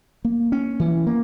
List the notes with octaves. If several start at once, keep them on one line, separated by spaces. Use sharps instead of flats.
A#3
C#4
E3
A#3